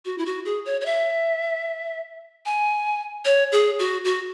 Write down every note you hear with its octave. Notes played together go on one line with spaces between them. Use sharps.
F#4
E4
F#4
G#4
C#5
C#5
E5
G#5
C#5
G#4
F#4
F#4